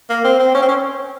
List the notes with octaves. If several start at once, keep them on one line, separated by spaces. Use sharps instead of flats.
A#3
C4
C4
C#4
C4
C#4